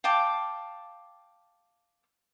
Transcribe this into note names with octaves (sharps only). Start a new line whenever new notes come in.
F5 G5 A5 D6